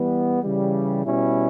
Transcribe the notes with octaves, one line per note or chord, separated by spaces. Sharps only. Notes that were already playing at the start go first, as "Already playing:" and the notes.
Already playing: E3 G3 B3
C#3 E3 G3
B2 G3 C#4 E4